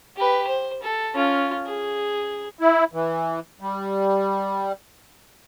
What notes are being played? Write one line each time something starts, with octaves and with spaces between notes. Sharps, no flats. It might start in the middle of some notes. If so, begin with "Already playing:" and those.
G4 B4
C5
A4
C#4 F4
G#4
E4
E3
G3